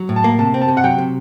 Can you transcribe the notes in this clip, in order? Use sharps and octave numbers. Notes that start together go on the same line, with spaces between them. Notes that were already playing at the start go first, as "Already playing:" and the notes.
Already playing: F#3
A2
A5
A#3
C3 A5
C4
A5
C3
F#5
F#3 G5
C3